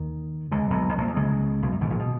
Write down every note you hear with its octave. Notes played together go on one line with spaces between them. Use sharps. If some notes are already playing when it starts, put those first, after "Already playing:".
Already playing: D#2 D#3
C#2 C#3
B1 B2
B1 B2
A#1 A#2
E2
C#2 C#3
B1 B2
F#2
G#1 G#2
A#1 A#2
B2